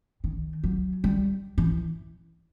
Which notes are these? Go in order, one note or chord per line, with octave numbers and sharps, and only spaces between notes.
D#3
F#3
G3
E3